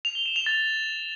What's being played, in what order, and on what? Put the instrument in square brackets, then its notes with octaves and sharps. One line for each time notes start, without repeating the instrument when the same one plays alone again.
[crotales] F7
G7
E7
F7
A6